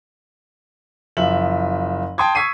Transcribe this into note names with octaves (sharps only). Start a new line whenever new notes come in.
F#1 F3 E5 F#7
G5 A5 C6 D#6 G#6
C#6 E6 G#6 B6 C7 D#7